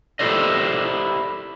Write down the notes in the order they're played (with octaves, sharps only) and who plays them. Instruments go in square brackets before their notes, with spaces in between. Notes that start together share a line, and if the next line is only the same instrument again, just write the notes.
[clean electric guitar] E4 G4 A4 C5 D5 D#5